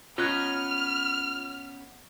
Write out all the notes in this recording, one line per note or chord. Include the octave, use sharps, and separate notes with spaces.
B3 C#4 F4 D#5 F6 F#6 G#6